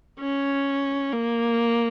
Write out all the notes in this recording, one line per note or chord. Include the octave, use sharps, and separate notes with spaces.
C#4
A#3